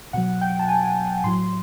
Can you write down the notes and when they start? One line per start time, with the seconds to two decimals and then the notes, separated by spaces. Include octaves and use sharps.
0.13 B2 F#3 F#5
0.41 G5
0.59 A5
0.68 G#5
1.24 A2 F#3 C6